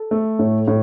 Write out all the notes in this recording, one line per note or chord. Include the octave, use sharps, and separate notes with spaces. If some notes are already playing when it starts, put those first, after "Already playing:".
Already playing: A4
A3
A2
A2